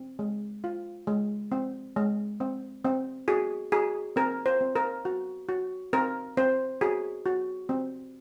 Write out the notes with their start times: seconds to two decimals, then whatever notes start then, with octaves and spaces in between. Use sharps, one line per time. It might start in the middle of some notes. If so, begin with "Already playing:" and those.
Already playing: C4
0.19 G#3
0.64 F4
1.07 G#3
1.52 C4
1.96 G#3
2.40 C4
2.85 C4
3.28 F#4 G#4
3.72 F#4 G#4
4.16 C4 A#4
4.46 C5
4.60 C4
4.76 A#4
5.05 F#4
5.49 F#4
5.93 C4 A#4
6.37 C4 C5
6.81 F#4 G#4
7.25 F#4
7.69 C4